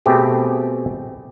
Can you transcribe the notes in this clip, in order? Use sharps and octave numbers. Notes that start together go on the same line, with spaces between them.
B2 A3 C4 G4 G#4